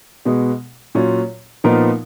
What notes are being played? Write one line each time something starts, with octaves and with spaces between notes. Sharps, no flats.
B2 G#3 B3
A#2 F#3 C#4 F4
A#2 F3 B3 D#4 A#4